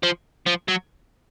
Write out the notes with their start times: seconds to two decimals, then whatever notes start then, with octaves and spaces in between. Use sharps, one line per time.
0.03 F3
0.47 F3
0.69 F#3